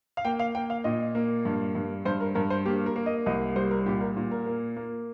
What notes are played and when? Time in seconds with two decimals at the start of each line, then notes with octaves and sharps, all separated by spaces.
0.17 F5
0.25 A#3 G5
0.39 F5
0.55 A#3 G5
0.70 F5
0.84 A#2 D#5
1.15 A#3
1.45 G2
1.75 G2
2.05 G2 C5
2.21 A#4
2.35 G2 A#4
2.50 C5
2.66 A#3 G4
2.86 A#4
2.96 A#3
3.06 D#5
3.26 C2 D#5
3.56 G3 C5
3.71 A#4
3.86 A#2 G4
4.01 A#4
4.17 A#2
4.31 A#4
4.46 A#3
4.76 A#3